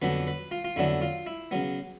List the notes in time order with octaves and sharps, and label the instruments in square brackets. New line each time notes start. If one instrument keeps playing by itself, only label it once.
[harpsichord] F2 D3 F#3 B3 D4 B4
B4
F4
F4
F2 D3 F#3 B3 D4 E4
F4
E4
C#3 F#3 B3